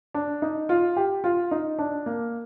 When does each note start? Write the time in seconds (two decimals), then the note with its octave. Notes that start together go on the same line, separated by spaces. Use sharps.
0.14 D4
0.42 D#4
0.69 F4
0.96 G4
1.24 F4
1.51 D#4
1.79 D4
2.06 A#3